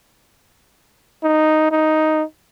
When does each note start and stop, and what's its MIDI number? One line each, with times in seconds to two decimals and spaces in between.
1.23 1.68 63
1.71 2.23 63